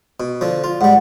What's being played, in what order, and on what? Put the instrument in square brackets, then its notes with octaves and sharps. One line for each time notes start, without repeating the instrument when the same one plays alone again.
[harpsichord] B2
D3 F3
F4
[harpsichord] G#2 G3 [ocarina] F#5